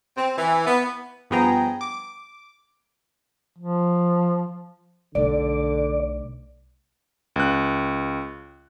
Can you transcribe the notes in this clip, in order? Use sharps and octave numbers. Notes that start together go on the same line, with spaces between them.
C4
E3
B3
G2 F3 B3 G#4 G5 A#5
D6
F3
B1 D3 A3 D5
C#2 F#6